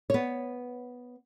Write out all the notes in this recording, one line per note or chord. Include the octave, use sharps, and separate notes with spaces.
B3 C#5